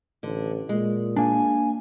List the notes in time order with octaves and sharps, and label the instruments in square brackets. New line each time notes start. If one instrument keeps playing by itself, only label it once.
[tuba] A1 [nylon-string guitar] D3
[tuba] A#2 [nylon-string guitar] G#3
[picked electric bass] A#3 D4 [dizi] G#5